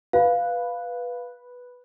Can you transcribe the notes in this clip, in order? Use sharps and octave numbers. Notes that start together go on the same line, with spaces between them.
B4 F5